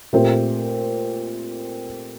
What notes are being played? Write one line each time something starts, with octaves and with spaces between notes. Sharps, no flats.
A#2 A3 C4 G4